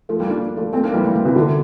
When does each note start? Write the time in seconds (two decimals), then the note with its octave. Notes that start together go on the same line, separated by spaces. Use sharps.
0.09 F3 A3
0.20 G3 A#3
0.30 A#3 D4
0.57 F3 A3
0.73 A3 C4
0.83 A#3 D4
0.94 E3 G3
1.04 G3 A#3
1.15 G3 A#3
1.25 C3 E3
1.36 D3